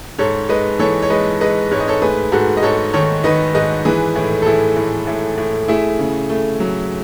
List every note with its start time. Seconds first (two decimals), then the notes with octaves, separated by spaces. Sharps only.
0.19 G#2 A4 C#5
0.49 G#3 B4 D#5
0.79 E3 A4 C#5
1.03 C#5
1.10 G#3 B4 D#5
1.41 G#3 B4 D#5
1.71 G#2 C#5
1.80 D#5
1.88 A4 C#5
2.02 A3 G#4 B4
2.32 G#2 F#4 A4
2.57 D#5
2.63 G#2 A4 C#5
2.93 D#3 A4 C#5
3.24 D#3 B4 D#5
3.54 G#2 B4 D#5
3.85 E3 G#4 B4
4.16 A2
4.42 A4
4.46 A2 E4 G#4
4.77 A2
5.07 A2
5.38 A2
5.68 A3 E4 G#4
5.99 C#3
6.30 A3
6.60 F#3